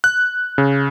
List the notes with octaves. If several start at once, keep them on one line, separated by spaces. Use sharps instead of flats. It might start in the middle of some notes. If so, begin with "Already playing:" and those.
F#6
C#3